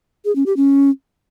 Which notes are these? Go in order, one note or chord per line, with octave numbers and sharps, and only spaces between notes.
G#4
C#4
G4
C#4